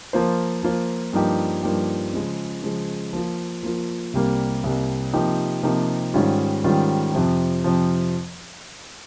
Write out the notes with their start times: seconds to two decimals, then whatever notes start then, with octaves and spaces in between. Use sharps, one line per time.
0.13 F3 A#3 F4 C5
0.63 F3 A#3 F4 C5
1.13 G2 F3 A#3 D#4 G4
1.63 G2 F3 A#3 D#4 G4
2.14 C#3 F3 G#3
2.63 C#3 F3 G#3
3.13 F3 A#3 F4
3.63 F3 A#3 F4
4.13 C2 C3 G3 A#3
4.63 C2 C3 G3 A#3
5.13 C3 F3 A#3 D#4 G4
5.63 C3 F3 A#3 D#4 G4
6.14 G#2 D#3 G3 C#4 F4
6.64 G#2 D#3 G3 C#4 F4
7.14 F2 C3 F3
7.64 F2 C3 F3